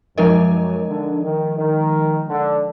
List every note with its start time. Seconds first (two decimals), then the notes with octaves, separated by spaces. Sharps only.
0.17 F#2 F3 G#3 D#4 A#4 D#5
0.88 D3
1.22 D#3
1.58 D#3
2.28 D3